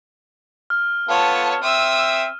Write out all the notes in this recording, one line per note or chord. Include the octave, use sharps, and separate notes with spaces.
F6
B3 F4 A4 C#5 A5
C4 E5 D#6 E6